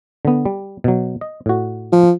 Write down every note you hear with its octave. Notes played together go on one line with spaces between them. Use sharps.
D3 B3
G3
B2 F#3
D#5
A2 F#4
F3